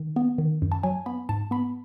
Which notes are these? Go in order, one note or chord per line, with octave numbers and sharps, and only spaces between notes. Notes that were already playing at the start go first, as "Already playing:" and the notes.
Already playing: D#3
B3
D#3
F#2
A5
F#3 G#5
B3 B5
G#2 A5
B3 B5